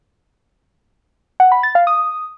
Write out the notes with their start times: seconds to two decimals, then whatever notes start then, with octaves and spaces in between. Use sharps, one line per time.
1.40 F#5
1.52 B5
1.63 A6
1.75 F5
1.87 D#6